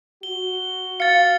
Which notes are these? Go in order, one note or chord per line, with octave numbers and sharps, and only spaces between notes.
F#4 G7
F5 A6 C#7